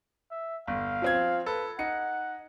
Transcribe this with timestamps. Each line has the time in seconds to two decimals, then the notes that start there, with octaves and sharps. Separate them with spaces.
0.31 E5
0.68 G1 F5
1.02 F3 C4 G#6
1.46 A4 B4
1.79 D#4 F#5 C#7